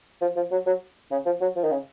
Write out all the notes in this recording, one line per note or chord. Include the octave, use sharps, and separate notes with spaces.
F3
F3
F#3
F#3
C#3
F3
F#3
F3
D#3
C#3